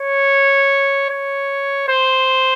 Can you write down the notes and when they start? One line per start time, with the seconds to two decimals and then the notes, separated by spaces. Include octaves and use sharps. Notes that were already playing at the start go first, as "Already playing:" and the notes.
Already playing: C#5
1.10 C#5
1.89 C5